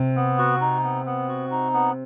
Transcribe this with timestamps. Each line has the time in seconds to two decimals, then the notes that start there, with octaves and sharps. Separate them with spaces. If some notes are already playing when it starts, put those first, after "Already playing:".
Already playing: C3
0.16 B3
0.38 F#4
0.61 D#4
0.83 B3
1.06 B3
1.29 F#4
1.51 D#4
1.74 B3